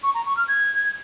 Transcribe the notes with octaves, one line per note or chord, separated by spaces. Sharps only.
C#6
A#5
C#6
F6
G#6